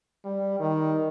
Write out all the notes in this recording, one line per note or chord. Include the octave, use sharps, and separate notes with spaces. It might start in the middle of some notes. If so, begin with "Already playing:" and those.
G3
D#3